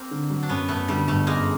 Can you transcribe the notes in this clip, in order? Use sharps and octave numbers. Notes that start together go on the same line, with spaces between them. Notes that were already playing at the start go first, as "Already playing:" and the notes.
Already playing: A#3 C4
D3
F#3
D4
F#2 B3 C#4
F#2 A3 B3
D3 G3 A3
G1 G3 A3
F#2 G#3 A#3